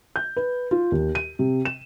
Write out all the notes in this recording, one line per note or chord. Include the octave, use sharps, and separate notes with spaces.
G6
B4
F4
D#2
D#7
C3
E7